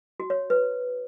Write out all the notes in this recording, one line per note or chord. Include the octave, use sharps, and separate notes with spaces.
F#4
C#5
B4